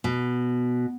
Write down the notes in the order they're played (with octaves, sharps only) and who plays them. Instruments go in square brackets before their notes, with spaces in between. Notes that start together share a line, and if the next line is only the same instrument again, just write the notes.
[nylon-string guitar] B2